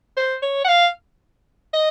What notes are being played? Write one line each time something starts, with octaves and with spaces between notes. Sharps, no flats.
C5
C#5
F#5
F5
D#5